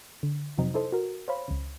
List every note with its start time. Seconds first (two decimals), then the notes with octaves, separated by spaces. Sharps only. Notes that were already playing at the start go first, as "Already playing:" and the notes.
0.23 D3
0.58 F2 C3 F#3 C4 D#4
0.74 D#4 E4 A4 C5 D#5
0.92 F#4 A#4
1.28 C5 C#5 F5 B5
1.48 C#2 C#3